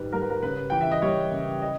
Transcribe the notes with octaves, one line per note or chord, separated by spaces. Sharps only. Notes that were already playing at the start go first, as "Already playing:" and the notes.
Already playing: G#2 D#3 G3 B4
G3 A#4
B4
A#4
C#3 B4
E3 G5
E5
D#5
G3 C#5
C#3
D#5